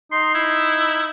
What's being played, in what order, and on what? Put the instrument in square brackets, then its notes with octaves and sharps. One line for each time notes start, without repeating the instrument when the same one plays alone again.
[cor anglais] D#4 [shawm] C6
[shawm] E4